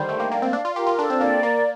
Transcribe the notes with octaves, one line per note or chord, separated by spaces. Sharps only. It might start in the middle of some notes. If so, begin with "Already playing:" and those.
Already playing: D3 D#3 G3 C5
A3 G5
A#3
A#3 D5
C4
D4 F5
F4
G4 A#4
F4
D4 A4
C4
A#3 D5
A#3 A#4